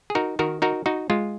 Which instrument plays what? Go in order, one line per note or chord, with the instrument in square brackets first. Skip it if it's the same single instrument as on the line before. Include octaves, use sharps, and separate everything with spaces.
[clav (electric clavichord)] G#4
D#4 F#4 A#4
D#3 F#4 A#4
D#4 F#4 A#4
D#4 F#4
G#3 F4